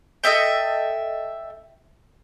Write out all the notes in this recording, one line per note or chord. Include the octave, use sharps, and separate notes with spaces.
A4 D#5 E5 G5